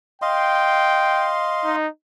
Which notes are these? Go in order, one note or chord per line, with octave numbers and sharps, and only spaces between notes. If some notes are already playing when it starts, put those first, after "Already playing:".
D#5 F5 G5 C6
D#4